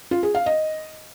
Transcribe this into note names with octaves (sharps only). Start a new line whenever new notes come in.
F4
G#4
F5
D#5